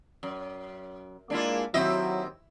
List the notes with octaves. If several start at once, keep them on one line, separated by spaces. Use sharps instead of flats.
F#2
G#3 A#3 D4 E4 F4
D#2 F#3 C4 E4 D#5